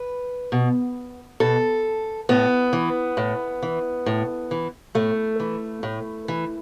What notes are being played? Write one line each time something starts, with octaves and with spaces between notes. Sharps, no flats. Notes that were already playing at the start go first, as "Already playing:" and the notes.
Already playing: B4
B2
B2 A4
A2 B3
E3
A2
E3
A2
E3
A2 A3
E3
A2
E3